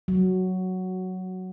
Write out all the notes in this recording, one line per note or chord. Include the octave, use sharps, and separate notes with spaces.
F#3